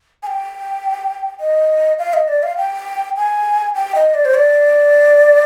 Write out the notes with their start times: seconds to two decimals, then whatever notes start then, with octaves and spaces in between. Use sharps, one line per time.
0.23 G#5
0.27 G5
1.40 D#5
1.99 F5
2.13 D#5
2.28 D5
2.43 F5
2.57 G5
3.17 G#5
3.75 G5
3.95 D#5
4.14 D5
4.25 C5
4.34 D5